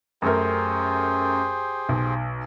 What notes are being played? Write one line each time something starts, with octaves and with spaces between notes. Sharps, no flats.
F#2 A3 G4 G#4 A#4 C5
B1